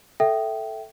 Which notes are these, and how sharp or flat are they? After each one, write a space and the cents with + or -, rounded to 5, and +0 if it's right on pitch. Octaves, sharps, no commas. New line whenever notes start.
A4 +0 E5 +0 G5 -15